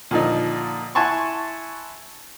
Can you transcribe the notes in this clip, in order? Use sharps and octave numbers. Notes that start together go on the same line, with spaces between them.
A#2 D3 F3 D#4
E4 F#5 G#5 A5 C6 C#6